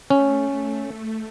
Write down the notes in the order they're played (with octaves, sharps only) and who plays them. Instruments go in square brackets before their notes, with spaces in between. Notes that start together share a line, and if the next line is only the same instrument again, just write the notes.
[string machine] A3 [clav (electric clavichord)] C#4